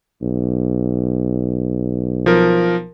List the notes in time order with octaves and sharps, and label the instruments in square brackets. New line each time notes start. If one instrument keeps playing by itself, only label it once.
[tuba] B1
[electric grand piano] F3 A#4